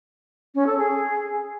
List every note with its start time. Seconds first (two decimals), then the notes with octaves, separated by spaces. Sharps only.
0.55 C#4
0.67 A4
0.78 G#4